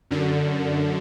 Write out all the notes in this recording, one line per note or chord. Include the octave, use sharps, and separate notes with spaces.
F#2 D3